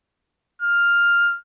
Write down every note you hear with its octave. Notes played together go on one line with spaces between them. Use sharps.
F6